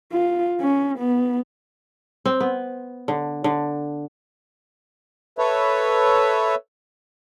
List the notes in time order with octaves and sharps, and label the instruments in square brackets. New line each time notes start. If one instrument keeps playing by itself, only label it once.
[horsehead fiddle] F4
C#4
B3
[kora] C4
B3
D3
D3
[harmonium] A4 B4 C#5 E5